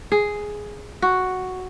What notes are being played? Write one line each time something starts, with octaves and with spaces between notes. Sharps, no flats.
G#4
F#4